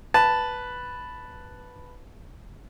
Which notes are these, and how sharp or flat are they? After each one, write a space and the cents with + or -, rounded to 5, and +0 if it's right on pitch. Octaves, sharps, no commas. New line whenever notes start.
B4 +0 A5 +0